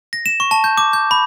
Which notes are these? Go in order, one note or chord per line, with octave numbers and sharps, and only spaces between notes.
A#6
E7
C#6
A5
G6
D6
G6
B5